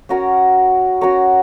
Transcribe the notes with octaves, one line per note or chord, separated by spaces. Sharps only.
C#4 F#4 A#4 C#5
C#4 F#4 A#4 C#5